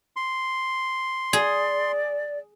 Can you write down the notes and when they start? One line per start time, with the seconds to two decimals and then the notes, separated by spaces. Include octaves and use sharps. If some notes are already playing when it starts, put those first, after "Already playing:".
0.16 C6
1.33 G#4 D5